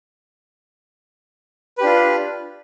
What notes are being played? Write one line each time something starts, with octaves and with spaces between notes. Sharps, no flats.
D4 F4 G4 B4